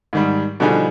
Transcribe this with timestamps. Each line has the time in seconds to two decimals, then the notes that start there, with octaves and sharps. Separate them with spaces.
0.13 G#2 D#3 G3
0.60 B2 D3 F3 G3 D#4 G#4